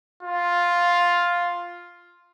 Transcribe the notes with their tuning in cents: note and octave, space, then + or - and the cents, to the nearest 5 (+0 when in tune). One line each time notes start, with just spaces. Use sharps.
F4 +5